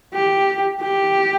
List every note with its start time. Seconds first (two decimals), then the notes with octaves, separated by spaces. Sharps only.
0.14 G4
0.82 G4